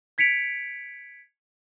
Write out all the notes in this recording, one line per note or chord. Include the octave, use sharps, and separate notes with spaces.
G#6 B6 C#7 D7 F7